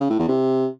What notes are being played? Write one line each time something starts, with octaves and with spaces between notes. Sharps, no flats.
C#3
A2
E2
C3